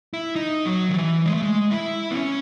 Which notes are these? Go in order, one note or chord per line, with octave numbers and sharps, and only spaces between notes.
E4
D#4
F#3
D#3
E3
G#3
A3
G#3
E4
B3
C#4